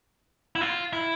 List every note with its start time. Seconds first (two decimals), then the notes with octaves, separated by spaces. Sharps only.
0.56 E4
0.61 F4
0.93 E4